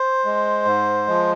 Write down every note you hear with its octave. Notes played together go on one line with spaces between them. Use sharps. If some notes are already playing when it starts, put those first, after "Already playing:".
Already playing: C5
G#3
G#2
F3 G#3